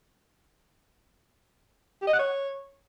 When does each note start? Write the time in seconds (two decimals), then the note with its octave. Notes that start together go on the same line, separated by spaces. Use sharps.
2.01 G4
2.07 D#5
2.13 F#5
2.19 C#5